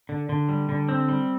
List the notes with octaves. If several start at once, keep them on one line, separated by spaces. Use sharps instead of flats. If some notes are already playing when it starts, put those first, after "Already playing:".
D3
D3
G3
D3
C4
G3